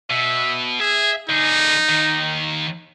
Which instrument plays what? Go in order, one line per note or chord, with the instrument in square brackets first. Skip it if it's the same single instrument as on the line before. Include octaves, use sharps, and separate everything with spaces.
[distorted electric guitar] B2 [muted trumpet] E5
[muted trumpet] G#4 [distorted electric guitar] E5
[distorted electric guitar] D3 G#4 [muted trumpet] D#4
[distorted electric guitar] D#2 D#3